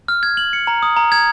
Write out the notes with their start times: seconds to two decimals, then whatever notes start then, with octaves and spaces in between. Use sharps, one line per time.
0.08 F6
0.23 G#6
0.37 F#7
0.53 C#7
0.67 A#5
0.82 D#6
0.97 A#5
1.12 G#6